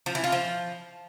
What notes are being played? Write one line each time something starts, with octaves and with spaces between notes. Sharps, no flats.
F3
E3
F4
F3